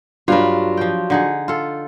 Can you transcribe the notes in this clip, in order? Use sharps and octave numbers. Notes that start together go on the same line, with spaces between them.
G2 F#3 D4 F4 B4
F3 G5
D3 D#4 G#4
F4 A4